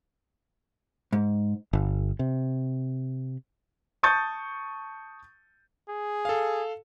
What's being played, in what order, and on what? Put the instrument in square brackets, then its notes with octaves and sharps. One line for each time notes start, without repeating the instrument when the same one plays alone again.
[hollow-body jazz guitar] G#2
[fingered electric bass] G1
C3
[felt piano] A5 C#6 D#6 G6 A6
[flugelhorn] G#4
[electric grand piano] A4 F5